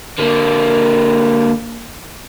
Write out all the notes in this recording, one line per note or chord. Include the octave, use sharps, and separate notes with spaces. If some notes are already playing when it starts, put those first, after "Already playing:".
D3 A#3